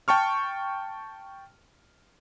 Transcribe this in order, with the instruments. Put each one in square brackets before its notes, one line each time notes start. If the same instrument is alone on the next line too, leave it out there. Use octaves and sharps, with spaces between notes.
[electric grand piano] G5 A5 C#6 F6